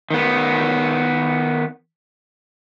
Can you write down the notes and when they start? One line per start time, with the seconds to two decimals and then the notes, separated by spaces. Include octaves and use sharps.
0.11 D#3 B3